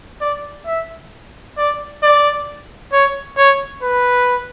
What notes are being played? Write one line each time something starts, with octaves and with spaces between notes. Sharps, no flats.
D5
E5
D5
D5
C#5
C#5
B4